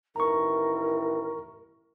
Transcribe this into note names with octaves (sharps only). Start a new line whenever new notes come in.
A1 D#3 E4 A#4 A#5 C#6